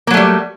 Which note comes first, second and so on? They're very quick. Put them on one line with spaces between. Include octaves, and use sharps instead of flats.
A#3 F#3 A3 G3